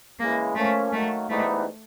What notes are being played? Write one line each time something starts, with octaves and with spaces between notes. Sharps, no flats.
C#3 E3 G#3 A#3
F3 A3 A#3 C#4
D#3 F#3 A3 A#3
G#2 E3 G3 A3 B3 D#4